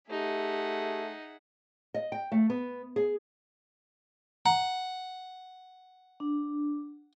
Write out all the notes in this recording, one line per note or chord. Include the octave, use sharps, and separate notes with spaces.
A3 D#4 G4 G#4 E5 F#5
D#5
G5
A3
B3
G#4
F#5 A#5
D4